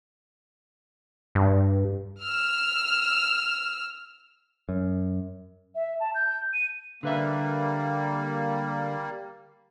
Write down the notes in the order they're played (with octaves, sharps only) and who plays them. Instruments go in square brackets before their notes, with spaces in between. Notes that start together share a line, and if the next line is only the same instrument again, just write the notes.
[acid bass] G2
[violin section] E6 F6
[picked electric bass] F#2
[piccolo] E5
A5
G6
D#7
[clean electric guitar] D3 B4 E5 [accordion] G3 A#3